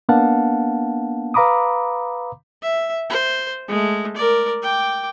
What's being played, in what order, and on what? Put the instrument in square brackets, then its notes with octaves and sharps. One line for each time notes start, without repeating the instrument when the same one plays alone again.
[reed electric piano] A#3 B3 D4 F5 F#5 A5
B4 F5 A#5 B5 D6 D#6
[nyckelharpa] E5
C5
G#3 A3
A#4 D5
G5 D6